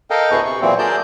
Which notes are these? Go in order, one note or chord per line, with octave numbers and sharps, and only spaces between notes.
A4 A#4 D#5 F5 G5
D2 A2 B3 G#4 B4 C#6
C3 C#6
A#2 E3 F#3 C4
F#3 G#4 A#4 D5 A5 G6